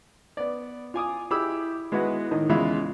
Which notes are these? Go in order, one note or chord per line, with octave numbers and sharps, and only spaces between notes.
B3 D5
F4 G#5 D6 D#6
E4 G4 G#4 B5 D6 E6
G#3 B3 E4 F#4 B4 F#5
A2 D#3 D#5
E2 C#3 G#3 F4 E5 B5